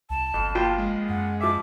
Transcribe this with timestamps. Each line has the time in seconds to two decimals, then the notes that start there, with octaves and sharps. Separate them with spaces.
0.10 C2 A5
0.34 G1 F2
0.55 A#1 F4 G5
0.78 G#3
1.09 F#2 F#5
1.41 F3 E5 D6